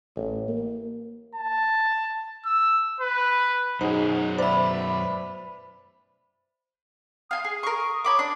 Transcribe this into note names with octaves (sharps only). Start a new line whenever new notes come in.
A1
A#3
A5
E6
B4
F#2 B2 F#3 D#4 G#4 C5
B4 C5 D5 E5 B5
F5 G#5 C6 D#6
G#4
A#4 C#6
C#5 B5 D6
D4